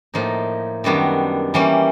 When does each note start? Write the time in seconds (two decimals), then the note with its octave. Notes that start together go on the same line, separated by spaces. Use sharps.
0.14 A2 F3 A#3 D#4
0.84 F#2 D#3 G3 B3 D4
1.54 E3 G3 A#3 C#4